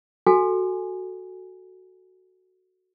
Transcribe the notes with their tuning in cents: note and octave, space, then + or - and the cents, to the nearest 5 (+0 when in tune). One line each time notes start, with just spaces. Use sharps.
F#4 +0 A4 +0 G#5 +0